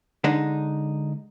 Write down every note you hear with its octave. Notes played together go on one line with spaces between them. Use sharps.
D3 G#3 D4 D#4